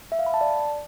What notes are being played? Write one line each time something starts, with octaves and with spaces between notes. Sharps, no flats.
E5
F5
B5
A5
D5